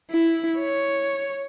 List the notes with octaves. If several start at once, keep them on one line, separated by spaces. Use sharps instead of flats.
E4
C#5